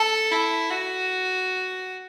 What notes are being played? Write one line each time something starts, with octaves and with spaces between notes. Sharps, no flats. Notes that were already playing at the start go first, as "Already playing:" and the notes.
Already playing: A4
E4
F#4